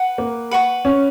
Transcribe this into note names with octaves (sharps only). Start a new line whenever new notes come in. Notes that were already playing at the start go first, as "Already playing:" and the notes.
Already playing: B4 F#5
A#3
B4 F#5 C#6
C#4